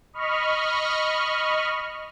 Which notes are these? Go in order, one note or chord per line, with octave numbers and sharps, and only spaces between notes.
D#5 B5 C#6 F6